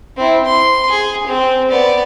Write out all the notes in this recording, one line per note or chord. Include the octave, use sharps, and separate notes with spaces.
C4 E4
C6
G#4
C4
B3 D5